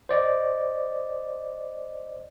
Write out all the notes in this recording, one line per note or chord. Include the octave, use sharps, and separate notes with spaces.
C5 D5 D#5